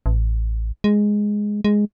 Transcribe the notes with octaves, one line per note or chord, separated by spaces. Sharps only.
A1
G#3
G#3